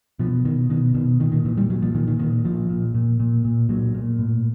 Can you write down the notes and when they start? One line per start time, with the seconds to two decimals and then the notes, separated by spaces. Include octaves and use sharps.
0.19 B2 F3
0.45 B2 D#3
0.70 B2 D#3
0.94 B2 D#3
1.20 A#2 D#3
1.32 D#3
1.45 A#2 E3
1.58 G3
1.70 A#2 F#3
1.82 F3
1.95 A#2 D#3
2.08 D#3
2.20 A#2 D#3
2.44 A#2 F3
2.70 A#2
2.95 A#2
3.20 A#2
3.45 A#2
3.69 A#2 F#3
3.95 A#2
4.19 A2